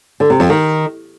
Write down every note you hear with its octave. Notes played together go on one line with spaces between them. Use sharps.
D3
C3
F2
D#3